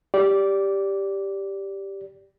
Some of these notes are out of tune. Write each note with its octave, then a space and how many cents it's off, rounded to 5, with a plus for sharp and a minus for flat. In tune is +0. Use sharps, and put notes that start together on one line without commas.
G4 +0 D5 -15